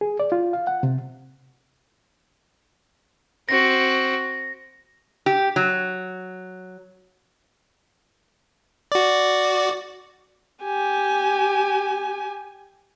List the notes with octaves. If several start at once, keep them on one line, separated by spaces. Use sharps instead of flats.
G#4
D5
F4
F5
F#5
C3
C4 F#4 A#6
G4
F#3
F#4 D5
G4 G#5